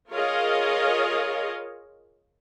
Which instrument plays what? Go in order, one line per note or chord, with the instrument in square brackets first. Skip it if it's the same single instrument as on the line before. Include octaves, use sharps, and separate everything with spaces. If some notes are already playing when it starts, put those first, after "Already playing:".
[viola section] F4 G#4 A#4 C#5 D#5 F5